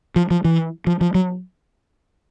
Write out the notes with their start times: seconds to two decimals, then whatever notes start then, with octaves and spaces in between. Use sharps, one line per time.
0.16 F3
0.31 F3
0.45 E3
0.87 F3
1.01 F3
1.15 F#3